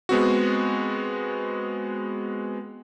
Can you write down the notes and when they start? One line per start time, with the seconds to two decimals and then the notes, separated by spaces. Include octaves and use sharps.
0.09 G#3 B3 C4 F#4